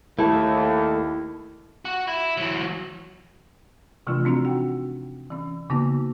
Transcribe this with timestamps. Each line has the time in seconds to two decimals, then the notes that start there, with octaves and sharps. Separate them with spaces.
0.19 D#2 A3 E4 A4
1.85 F#4
2.07 E4
2.37 E3 F#3
4.07 C3 E3 F3 A3 D4 F4
4.25 C4 D4 D#4 F#4
4.45 F#4 F#5 G5
5.30 E3 C#4
5.70 C#3 A#3 B3 D#4 F#4